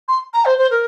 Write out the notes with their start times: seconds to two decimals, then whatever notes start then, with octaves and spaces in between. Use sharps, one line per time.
0.08 C6
0.34 A#5
0.45 C5
0.58 C5
0.71 A#4